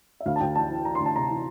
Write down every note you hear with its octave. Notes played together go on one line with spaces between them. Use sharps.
E5
D2 F5
A5
D2 G5
E3 A5
E3
E3 A#5
C6
D2
A5
C3 A#5
E3